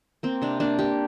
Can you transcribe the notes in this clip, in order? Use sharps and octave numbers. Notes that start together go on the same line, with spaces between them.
A#3 C4
C3 D4
A#3 D4
A#3 G4